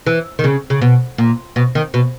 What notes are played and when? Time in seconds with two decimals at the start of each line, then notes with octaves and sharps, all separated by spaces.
0.07 E3
0.39 D#3
0.44 C#3
0.70 C#3
0.82 B2
1.18 A#2
1.56 B2
1.75 D#3
1.94 B2